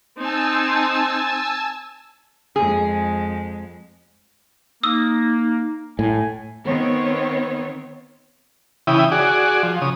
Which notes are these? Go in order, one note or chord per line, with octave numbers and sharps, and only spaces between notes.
C4 D#4 G#5 A5 E6
F2 G#3 G#4
A#3 D#4 D#6 E6
A2 G#5
D#3 B3 C4 C#5
C#3 E3 E4 G5 D#6
F#4 G#4 D5
F3
C#3 D#6